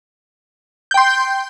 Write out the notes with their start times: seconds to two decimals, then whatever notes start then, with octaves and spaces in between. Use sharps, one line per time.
0.91 G6
0.94 G5
0.97 C6